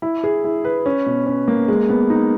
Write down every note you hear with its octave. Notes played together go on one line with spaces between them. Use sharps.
E4
G#4
E4
B4
C#4
B2
C#4
A#3
G#3
B3
D#4